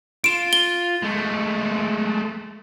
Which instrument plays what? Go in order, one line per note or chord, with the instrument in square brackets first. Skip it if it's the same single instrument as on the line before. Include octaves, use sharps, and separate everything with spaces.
[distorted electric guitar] F4 [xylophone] D7 E7
[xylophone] G7
[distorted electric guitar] G#3 A3